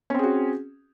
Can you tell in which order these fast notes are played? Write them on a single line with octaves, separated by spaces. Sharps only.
C#4 C4 G#4 F#4